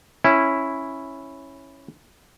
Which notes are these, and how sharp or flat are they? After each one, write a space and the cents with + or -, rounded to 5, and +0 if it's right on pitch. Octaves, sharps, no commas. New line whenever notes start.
C#4 -10 E4 +0